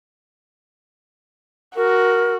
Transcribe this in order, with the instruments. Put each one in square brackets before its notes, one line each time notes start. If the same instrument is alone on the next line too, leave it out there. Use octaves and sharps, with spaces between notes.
[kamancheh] F#4 [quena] A#4